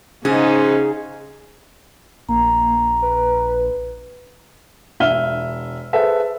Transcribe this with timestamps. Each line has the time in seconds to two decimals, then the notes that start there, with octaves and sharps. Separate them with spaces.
0.25 G#2 C#3 C#4 D#4 G#4
2.29 A#1 A#3 A#5
3.02 B4
5.00 E1 E5 F6 D#7 G7
5.93 G#4 A4 B4 C5 E5